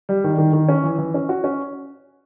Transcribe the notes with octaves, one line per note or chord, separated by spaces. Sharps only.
G3
D#3
D#3
D#3
C#4
E3
E3
C#4
F#4
C#4